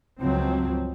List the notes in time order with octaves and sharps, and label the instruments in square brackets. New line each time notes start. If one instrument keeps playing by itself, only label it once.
[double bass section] C#2 G2 F3 F#3 C4